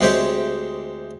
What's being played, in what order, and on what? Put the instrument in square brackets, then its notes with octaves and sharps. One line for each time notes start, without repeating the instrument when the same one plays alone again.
[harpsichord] D2 G#3 C4 G4 C#5 E5